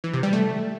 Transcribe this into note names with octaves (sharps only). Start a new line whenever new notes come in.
E3
C3
G3
A3